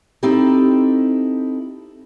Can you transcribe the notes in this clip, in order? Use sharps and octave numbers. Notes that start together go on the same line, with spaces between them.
C4 D#4 E4 G4 A4